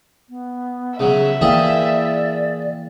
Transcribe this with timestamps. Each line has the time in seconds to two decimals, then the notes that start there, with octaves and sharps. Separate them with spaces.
0.29 B3
1.00 C#3 F#3 E5
1.41 E3 A#3 G#4 D5 F5 G5 A5